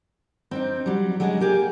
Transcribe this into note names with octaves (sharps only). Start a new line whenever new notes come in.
C4 D4 D#4
F#3 G3
F#3 G#3 D4 E4 G#4 D#5
A#3 G4 G#4 G#5